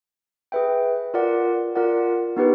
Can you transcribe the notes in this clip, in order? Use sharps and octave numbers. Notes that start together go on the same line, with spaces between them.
G#4 B4 E5 G5
F4 A#4 D5 F#5
F4 A#4 D5 F#5
B3 D#4 G4 B4